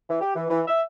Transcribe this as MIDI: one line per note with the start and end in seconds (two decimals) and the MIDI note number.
0.10 0.18 52
0.21 0.34 67
0.36 0.44 52
0.50 0.61 52
0.67 0.81 76